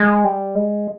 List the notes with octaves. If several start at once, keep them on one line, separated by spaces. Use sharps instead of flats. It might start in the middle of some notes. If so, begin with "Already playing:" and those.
Already playing: G#3
G3
G#3